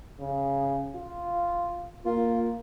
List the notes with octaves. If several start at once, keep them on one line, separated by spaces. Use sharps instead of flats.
C#3
F4
A#3 F4